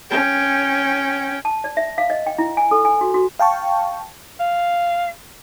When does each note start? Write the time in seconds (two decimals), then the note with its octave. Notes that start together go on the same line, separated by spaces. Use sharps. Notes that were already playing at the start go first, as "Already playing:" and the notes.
0.11 C#4 G5
1.45 A5
1.64 D5
1.77 E5
1.98 F5
2.10 D#5
2.26 G5
2.38 E4
2.57 G#5
2.71 A4
2.85 G#5
3.01 F#4
3.14 F#4
3.39 F5 G5 A5 C#6
4.40 F5